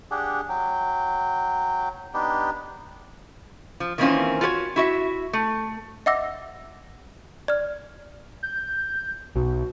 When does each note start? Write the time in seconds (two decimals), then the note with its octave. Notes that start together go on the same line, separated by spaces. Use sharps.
0.11 D4 G4 G#4 F#5
0.49 F#3 G5
2.14 B3 D4 D#4 G4
3.80 F3
3.98 D#3 E3 A#3 C4 C#4 F4
4.41 F4 F#4 B4 C#5
4.76 E4 F#4 E5
5.33 A3
6.06 D#5 E5 F#5 D6 E6 A#6
7.48 D5 F6
8.43 G6
9.36 B1 F#4